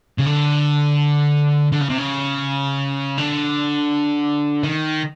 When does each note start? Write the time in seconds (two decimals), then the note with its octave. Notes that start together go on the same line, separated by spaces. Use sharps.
0.19 C#3
0.26 D3
1.72 D3
1.81 C#3
1.89 C3
1.98 C#3
3.18 D3
4.63 D#3